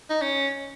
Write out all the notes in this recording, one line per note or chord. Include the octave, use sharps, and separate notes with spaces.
D#4
C#4